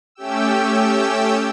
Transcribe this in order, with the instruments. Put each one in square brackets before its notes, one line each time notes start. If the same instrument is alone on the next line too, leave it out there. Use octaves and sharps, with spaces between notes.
[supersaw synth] A3 C#4 G4 G5 E6